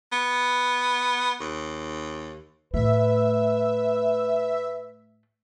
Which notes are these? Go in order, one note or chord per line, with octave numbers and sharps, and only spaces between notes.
B3
D#2
A2 A3 B4 E5